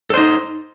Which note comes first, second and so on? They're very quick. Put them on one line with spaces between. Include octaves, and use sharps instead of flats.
A4 C5 D#4